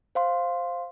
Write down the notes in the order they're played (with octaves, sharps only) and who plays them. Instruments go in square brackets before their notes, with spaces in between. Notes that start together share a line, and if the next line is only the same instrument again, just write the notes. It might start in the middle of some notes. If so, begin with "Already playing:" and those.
[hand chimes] C5 F5 C6